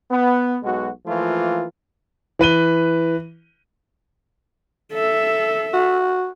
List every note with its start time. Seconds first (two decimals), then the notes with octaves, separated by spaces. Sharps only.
0.11 B3
0.63 B1 B2 G#3 F#4
1.06 E3 F3 A3 A#3 F4
2.39 E3 B4 D#7 G7
4.93 A4 E5
5.74 F#4